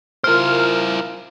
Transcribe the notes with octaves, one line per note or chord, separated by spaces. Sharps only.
E4 F4 A#4 C5 F6